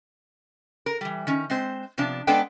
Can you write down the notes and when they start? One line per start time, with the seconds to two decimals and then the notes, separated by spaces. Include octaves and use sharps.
0.86 A#4
1.01 E3 G3
1.27 D#3 C#4
1.50 G#3 C4 C5
1.98 C3 F3 B3 D4 A5
2.27 G#3 B3 D4 A4 B4 G5